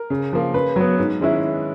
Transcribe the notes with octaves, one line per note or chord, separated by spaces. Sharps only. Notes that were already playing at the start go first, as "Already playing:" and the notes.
Already playing: A#4
C#3
F3 A#3
C#3 B4
F#3 B3
G#2
D#3 G#3 C#4 E4